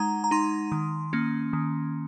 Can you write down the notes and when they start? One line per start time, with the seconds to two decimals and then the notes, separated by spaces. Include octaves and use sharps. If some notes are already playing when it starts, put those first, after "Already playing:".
Already playing: G#3 D#4 F#5 A#5
0.24 A#5
0.31 D#4 C6
0.72 D#3
1.13 A#3 C#4
1.53 D#3